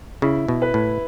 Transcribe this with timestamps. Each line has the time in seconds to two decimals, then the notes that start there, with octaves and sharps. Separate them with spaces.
0.22 C#3 E4
0.48 B2
0.62 B4
0.74 A2